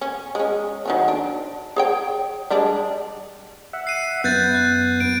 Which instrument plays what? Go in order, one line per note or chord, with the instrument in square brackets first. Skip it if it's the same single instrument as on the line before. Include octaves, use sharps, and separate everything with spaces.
[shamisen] C#4
G#3 C#4
D#3 F#3 C#4
D4
G#4 C#5 G5
G3 G#3 D4
[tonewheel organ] E5 F#5
[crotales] C7 D#7
[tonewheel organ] F#2 B3 [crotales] F#6 G6 A6
[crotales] F#6
D7